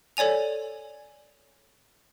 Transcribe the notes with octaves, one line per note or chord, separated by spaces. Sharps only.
A4 C#5 D5 G#5 F7